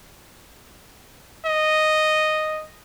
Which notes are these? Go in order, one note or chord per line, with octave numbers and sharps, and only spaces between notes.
D#5